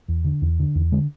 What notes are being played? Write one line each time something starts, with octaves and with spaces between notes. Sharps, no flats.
E2
D3
E2
D3
E2
D3 G#3